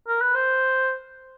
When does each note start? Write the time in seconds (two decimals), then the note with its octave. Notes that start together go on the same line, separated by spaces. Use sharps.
0.08 A#4
0.21 B4
0.34 C5